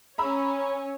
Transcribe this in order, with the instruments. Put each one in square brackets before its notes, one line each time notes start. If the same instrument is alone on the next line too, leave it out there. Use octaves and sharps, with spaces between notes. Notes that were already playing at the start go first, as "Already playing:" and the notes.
[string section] C#4 C#5 [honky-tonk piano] A#5 B5 E6